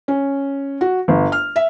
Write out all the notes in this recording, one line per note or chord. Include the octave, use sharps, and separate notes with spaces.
C#4
F#4
G1
F6
E5